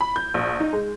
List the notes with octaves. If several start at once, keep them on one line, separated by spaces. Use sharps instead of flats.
B5
G6
A#1
D#4
G#3